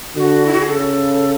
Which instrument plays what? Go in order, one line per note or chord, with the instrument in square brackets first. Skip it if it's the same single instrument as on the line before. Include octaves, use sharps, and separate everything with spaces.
[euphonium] D3 [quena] F#4
[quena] E4
F#4
G#4
[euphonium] C#3 [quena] A4